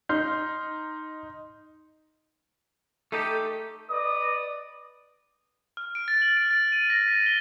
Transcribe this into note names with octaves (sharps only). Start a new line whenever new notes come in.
D#4 C6 F6 G6
A3 D#4 G4 A4
B4 D5 D#5 D#6
F6
D7
A6
F#7
D7
A6
D#7
A#6
B6
G7